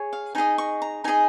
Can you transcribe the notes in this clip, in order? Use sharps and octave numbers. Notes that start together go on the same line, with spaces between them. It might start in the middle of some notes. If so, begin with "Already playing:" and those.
Already playing: G#4 C#5
F5
D#4 G#4 D#5 G#5
C#6
A#5
D#4 G#4 D#5 G#5